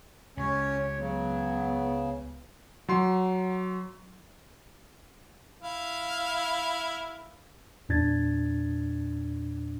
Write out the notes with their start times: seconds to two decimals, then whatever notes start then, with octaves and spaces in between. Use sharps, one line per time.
0.37 C#2 C#4 F4 G4 C#5
0.99 C#3 F#3 B3
2.89 F#3 C6
5.62 E4 F5
7.89 E2 A#2 D4 G#6 A6